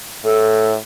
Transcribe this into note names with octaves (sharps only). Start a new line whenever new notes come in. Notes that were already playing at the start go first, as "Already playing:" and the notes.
A2 A4